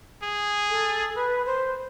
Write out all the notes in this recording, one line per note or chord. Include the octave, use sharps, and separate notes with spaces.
G#4
A4
B4
C5